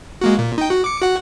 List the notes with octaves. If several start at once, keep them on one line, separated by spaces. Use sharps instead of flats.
G#3 A#3 F#4
A#2
D#4 G5
F#4
D6 C#7
F#4 F#5